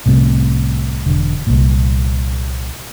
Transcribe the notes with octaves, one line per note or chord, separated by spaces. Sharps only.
C2 A2 C3
E1 D3
C2 A#2